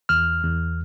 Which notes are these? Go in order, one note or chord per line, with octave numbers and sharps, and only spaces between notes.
E2 F6
E2